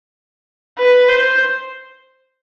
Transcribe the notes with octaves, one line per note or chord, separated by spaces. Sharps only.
B4
C5